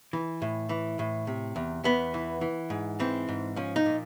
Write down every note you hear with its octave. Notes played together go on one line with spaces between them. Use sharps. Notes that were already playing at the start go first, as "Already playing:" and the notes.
E3
A2
E3
A2
C3
E2
E2 B3
E3
E3
G#2
E3 C4
G#2
F3 C#4
D#4
A#2